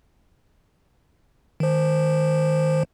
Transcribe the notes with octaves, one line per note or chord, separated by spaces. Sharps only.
D#3 C5